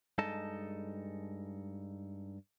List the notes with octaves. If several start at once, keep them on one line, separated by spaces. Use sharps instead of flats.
G2 G#3 D#4 A4 D#5 A5